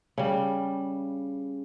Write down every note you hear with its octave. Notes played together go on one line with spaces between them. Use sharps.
C#3 G3